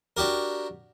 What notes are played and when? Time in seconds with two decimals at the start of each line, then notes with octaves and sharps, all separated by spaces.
0.17 D4 F#4 G4 A#4